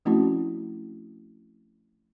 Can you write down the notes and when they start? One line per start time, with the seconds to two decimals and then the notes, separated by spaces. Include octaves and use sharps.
0.05 F3 A3 C4 C#4 E4 F#4